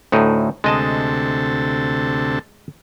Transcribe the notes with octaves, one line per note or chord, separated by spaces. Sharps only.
D2 A2 D#4
D2 C3 G#3 A4 D#5 A5